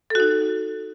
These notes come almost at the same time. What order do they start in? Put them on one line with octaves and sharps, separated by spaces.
A4 F#4 D#4